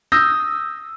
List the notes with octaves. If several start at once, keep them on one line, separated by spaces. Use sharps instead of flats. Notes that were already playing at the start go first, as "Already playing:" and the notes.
D#6 E6 G6 A#6